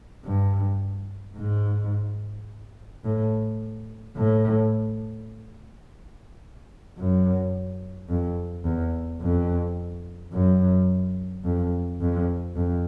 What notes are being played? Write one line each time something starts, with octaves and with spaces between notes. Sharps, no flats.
G2
G#2
A2
A2
F#2
F2
E2
F2
F#2
F2
F2
F2